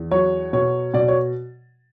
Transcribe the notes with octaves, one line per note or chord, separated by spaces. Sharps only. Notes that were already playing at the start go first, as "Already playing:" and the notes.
Already playing: E2
F#3 C#5
B2 C#5
B2 D5
C#5